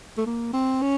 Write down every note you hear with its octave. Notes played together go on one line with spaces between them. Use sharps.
A3
A#3
C4
C#4